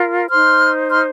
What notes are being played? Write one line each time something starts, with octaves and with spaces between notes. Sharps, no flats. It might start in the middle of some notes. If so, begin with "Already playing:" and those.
Already playing: F4 A#4
D#4 C5 C6 F6
C6 F6